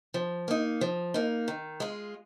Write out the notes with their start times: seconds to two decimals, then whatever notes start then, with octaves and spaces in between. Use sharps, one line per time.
0.14 F3
0.48 A#3 D#4
0.81 F3
1.14 A#3 D#4
1.48 D#3
1.80 G#3 F4